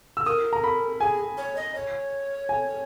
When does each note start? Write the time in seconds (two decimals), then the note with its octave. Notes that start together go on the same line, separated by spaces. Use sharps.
0.17 E6
0.26 A#4 D#6
0.53 A#5
0.64 B5
1.00 G#4 G#5
1.37 C#5
1.56 D#5
1.75 C#5
2.49 G#5